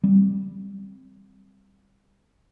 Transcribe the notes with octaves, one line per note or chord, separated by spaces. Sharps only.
G3 C4